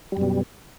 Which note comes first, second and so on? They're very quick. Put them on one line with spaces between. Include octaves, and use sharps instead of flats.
G3 F#2 B2